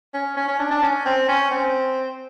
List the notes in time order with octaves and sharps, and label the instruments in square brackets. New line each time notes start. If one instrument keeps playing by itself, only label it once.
[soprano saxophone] C#4
C#4
C#4
D4
D4
C#4
C4
C#4
C4